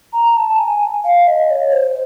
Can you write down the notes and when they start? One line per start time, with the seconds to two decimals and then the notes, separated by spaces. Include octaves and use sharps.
0.13 A#5
0.37 A5
0.59 G#5
1.04 F5
1.27 D#5
1.51 C#5
1.73 C5